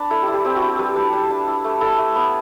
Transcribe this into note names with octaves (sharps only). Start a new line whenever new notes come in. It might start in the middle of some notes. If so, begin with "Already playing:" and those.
Already playing: D4 B4 D5
E4 A4
G4
E4
G4
C4 G4
F#4
E4
G4
G3 B4
D4 B4
D4
D4
E4
A3
E4 A4
A3
B3